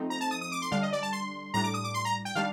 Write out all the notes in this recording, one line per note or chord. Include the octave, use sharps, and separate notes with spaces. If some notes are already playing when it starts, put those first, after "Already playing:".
Already playing: F3 A3 C4 D#4
A#5
A5
D#6
D#6
D6
C6
D3 G3 D4 F5
D#5
D5
A5
C6
A2 G3 D4 A#5
D6
D#6
D6
C6
A#5
G5
D#3 G3 D4 F5